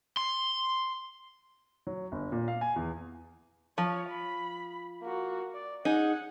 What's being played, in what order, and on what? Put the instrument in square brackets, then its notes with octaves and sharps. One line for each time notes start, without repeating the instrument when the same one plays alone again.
[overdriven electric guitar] C6
[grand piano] F#3
G1
A#2
F5
G#5
E2
[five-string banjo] F3 [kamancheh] C#5
[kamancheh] B5
A#3 F#4
D5
[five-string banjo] D#4 G#4 [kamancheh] F#5